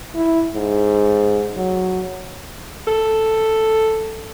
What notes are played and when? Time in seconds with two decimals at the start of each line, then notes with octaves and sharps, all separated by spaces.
0.15 E4
0.55 G#2
1.57 F#3
2.87 A4